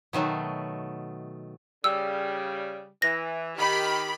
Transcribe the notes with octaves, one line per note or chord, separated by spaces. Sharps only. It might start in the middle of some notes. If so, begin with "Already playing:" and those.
B2 D#3 F#3 A3
C#3 G3 E6
E3 A#6
D#3 G4 B5